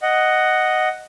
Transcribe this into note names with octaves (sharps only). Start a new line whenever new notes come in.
D#5 F#5